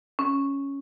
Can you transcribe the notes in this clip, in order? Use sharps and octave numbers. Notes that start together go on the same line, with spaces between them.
C#4